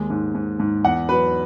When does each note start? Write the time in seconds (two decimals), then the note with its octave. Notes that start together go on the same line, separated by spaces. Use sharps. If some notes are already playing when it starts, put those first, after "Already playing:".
Already playing: D#2 G#3
0.10 G#2
0.35 G#2
0.60 G#2
0.84 E2 F#5
1.09 F#3 B4